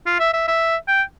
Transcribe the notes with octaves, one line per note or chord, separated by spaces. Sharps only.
F4
E5
E5
E5
G5